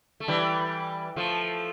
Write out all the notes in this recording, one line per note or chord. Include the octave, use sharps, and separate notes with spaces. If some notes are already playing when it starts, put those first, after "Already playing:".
A3
E3 G3
F3 A3